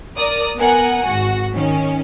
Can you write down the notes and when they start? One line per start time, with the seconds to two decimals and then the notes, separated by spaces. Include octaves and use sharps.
0.17 A#4 D5 D#6
0.57 B3 A#4 F#5 G#5
1.06 G#1 F#4
1.53 D#3 C#4